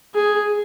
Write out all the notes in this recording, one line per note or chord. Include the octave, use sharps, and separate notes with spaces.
G#4